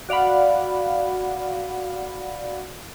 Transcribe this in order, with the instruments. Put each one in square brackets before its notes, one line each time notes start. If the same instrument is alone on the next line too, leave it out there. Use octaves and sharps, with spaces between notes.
[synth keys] F#4 D5 F5 F#5 B5